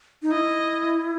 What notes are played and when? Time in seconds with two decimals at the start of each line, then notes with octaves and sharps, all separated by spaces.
0.22 D#4
0.32 E4 D#5